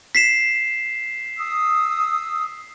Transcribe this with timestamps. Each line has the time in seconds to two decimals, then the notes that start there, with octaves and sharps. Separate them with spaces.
0.15 B6 C7 E7
1.39 D#6 E6